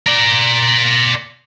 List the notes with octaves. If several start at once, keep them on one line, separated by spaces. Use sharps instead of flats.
A#4 D5